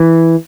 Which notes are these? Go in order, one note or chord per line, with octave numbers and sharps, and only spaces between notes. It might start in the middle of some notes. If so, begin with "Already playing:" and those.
Already playing: E3